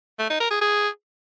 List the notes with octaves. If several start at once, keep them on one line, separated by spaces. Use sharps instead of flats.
A3
D#4
A#4
G#4
G#4